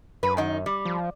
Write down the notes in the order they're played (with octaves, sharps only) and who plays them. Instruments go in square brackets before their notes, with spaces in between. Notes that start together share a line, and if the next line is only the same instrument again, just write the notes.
[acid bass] F#2 [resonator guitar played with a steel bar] B4
[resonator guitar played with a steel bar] D#3 D#4
G3
[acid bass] F3